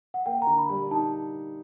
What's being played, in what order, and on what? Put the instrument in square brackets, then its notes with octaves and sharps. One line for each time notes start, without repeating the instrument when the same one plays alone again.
[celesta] F#5
[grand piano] A#3 [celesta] G5
[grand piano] D3 [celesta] A#5
[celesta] B5
[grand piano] G3
[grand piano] D#4 [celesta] A5